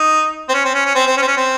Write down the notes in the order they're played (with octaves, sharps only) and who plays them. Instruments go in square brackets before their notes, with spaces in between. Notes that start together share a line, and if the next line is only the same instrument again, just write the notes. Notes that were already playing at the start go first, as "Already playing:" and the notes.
Already playing: [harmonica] D#4
C4
C#4
C4
C#4
C#4
C4
C4
C#4
C4
C#4
C4